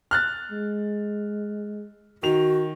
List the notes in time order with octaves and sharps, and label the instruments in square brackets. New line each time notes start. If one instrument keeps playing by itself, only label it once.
[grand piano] F6 F#6 A6
[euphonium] G#3
[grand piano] D#3 F7 [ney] F#4